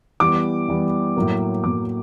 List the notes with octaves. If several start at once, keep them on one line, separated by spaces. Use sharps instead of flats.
E3 G3 B3 D6
E3 G3 B3
A2 F#3 A#3
A2 F#3 A#3 D6